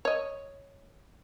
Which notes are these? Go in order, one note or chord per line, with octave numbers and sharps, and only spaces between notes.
C#5 D#5